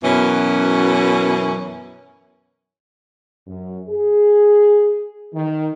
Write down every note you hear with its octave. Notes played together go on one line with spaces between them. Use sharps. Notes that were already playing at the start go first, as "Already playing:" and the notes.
F#2 B2 E3 C#4
F#2
G#4
D#3